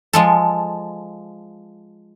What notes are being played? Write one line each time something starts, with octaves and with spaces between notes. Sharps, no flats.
F3 G#3 A4